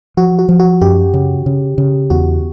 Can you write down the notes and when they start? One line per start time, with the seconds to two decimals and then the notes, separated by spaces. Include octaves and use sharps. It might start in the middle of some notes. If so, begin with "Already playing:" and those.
0.17 F3 F#4
0.39 F#4
0.49 F3
0.60 F#4
0.81 F#2 G4
1.14 C#3
1.46 C#3
1.78 C#3
2.10 E2 F#4